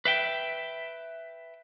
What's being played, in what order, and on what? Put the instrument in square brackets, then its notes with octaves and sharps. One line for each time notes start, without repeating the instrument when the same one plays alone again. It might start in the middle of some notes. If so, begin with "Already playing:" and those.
[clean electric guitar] B4 E5 G5